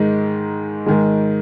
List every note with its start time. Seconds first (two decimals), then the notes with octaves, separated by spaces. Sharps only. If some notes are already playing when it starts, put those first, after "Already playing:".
Already playing: G#2 D#3 G#3
0.86 G#2 D#3 G#3